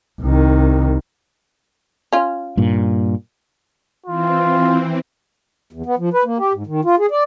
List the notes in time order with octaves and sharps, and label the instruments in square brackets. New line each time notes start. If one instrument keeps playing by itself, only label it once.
[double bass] C2 D#3
[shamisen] C#4 F4
[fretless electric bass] G2 A#2
[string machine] E3 C4 [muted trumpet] F4
[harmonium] E2
B3
F3
B4
A#3
G4
G#2
D#3
F4
G#4
D5